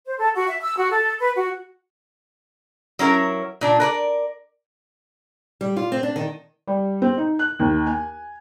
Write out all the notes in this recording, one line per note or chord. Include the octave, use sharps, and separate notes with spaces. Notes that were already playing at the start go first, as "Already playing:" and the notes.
C5
A4
F#4
E5
E6
F#4
A4
B4
F#4
F#3 C#4 E4 A#4
A#2 D4
A#4 B4 D5
G3
F4
C4
D4
D#3
G3
C4
D#4
F#6
D#2
G#5